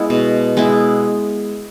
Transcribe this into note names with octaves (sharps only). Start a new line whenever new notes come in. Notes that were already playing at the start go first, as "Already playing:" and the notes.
Already playing: G#3 B3 E4
B2
G#3 B3 E4